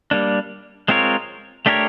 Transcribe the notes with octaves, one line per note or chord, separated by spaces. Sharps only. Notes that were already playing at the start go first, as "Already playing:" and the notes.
G3 A#3 D4
G#3 C4 F4 A#4 C#5
A3 D4 G4 A#4 C#5